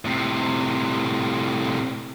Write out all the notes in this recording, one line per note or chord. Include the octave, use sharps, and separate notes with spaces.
A2 C3